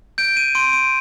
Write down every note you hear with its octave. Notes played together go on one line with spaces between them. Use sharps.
G6 D7
D#7
C6 D7
D7